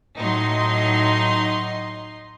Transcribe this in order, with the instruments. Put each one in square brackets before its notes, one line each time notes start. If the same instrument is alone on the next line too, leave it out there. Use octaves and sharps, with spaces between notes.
[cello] A2 F#3 [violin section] D#4 D#5 C6